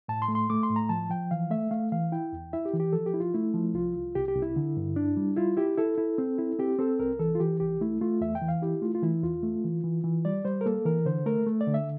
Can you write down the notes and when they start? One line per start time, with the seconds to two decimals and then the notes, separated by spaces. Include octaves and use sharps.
0.08 A2 A5
0.22 C6
0.28 A3
0.35 C6
0.50 A3 D6
0.63 C6
0.69 A2
0.76 A#5
0.89 F3 A5
1.10 F3 G5
1.31 E3 F5
1.50 A3 E5
1.71 A3 F5
1.92 E3 F5
2.12 E4 G5
2.33 E2
2.53 E4 E5
2.65 G4
2.73 E3
2.80 G4
2.93 F3 A4
3.06 G4
3.14 E4
3.20 F4
3.34 A3 E4
3.54 F3
3.74 C2 F4
3.95 C2
4.15 C2 G4
4.28 G4
4.35 C2
4.42 E4
4.56 D3
4.77 G2
4.96 D4
5.17 G3
5.36 E4 F4
5.57 E4 G4
5.78 E4 A4
5.98 E4
6.18 C4
6.38 E4
6.59 C4 G4
6.79 C4 A4
6.99 C2 A#4
7.19 E3 A4
7.35 F4
7.40 E3 G4
7.60 C2 G4
7.81 A3 E4
8.01 A3 F4
8.21 E2 E5
8.35 G5
8.42 E3
8.48 F5
8.62 E4 G4
8.82 A3 F4
8.95 F4
9.02 E3 E4
9.23 E2 F4
9.43 A3
9.64 E3
9.84 E3
10.04 E3
10.25 G3 D5
10.45 G3 C5
10.61 A#4
10.66 A#3 A4
10.85 E3 A#4
11.05 D3 C5
11.26 A3 A#4
11.47 A3
11.61 D5
11.67 D3
11.74 E5